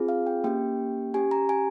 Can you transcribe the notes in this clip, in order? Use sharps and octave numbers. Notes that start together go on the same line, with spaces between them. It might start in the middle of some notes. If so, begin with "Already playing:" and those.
Already playing: C4 F4 G#4
F5
G5
A#3 C#4 G4 G5
C#4 G4 G#5
A#5
G#5